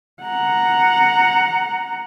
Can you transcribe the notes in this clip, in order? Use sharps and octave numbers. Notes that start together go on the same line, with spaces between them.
F#5 A#5